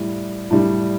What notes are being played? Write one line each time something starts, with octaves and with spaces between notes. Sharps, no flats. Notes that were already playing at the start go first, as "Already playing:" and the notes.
Already playing: A2 G3
A2 G3